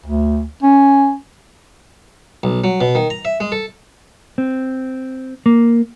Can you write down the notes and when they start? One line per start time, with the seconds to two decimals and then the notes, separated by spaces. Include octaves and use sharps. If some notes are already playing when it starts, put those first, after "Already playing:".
0.06 D2
0.63 C#4
2.43 B1
2.64 F#3
2.81 B2
2.95 D#3
3.10 A#5
3.25 E5
3.40 G#3
3.52 A4
4.38 C4
5.46 A#3